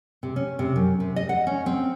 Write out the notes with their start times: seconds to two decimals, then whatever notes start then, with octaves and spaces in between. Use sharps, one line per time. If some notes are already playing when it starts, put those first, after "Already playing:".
0.23 C3
0.36 C#4
0.59 C3
0.76 F#2
1.00 C3
1.16 D#5
1.29 F#5
1.47 C#4
1.66 C4